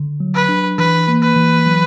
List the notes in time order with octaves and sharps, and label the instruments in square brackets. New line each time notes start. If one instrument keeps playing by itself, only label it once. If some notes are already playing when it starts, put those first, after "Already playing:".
Already playing: [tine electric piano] D3
F#3
[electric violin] B4
[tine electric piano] D4
[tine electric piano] E3 [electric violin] B4
[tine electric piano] A#3
[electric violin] B4
[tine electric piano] E3
F#3